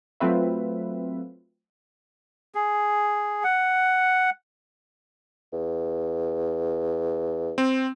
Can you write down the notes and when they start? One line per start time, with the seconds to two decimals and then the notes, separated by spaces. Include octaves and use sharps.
0.20 F#3 A3 C4 F4 B4 E5
2.55 G#4
3.44 F#5
5.52 E2
7.58 C4